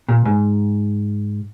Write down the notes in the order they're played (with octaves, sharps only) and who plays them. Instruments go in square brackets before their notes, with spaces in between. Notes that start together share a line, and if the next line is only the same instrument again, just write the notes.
[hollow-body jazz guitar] A#2
G#2